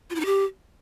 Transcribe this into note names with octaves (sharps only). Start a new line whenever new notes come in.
F4
E4
D#4
G4